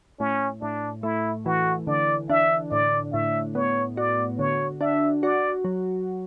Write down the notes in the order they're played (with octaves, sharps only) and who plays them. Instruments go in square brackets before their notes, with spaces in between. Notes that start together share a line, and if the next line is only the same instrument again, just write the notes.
[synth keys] A2 [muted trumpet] C#4
[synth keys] A2 [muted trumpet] D4
[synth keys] A3 [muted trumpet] E4
[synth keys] E3 [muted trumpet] F#4
[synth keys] D3 [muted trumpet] D5
[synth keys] D4 [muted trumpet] E5
[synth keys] A2 [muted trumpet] D5
[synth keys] A2 [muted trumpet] E5
[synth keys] B3 [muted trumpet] C#5
[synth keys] F#4 [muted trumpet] D5
[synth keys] D3 [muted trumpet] C#5
[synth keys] D4 [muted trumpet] E5
[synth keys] F#4 [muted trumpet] D5
[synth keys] F#3